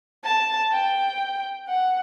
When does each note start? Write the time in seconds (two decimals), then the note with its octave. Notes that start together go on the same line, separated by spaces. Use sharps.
0.24 A5
0.72 G5
1.68 F#5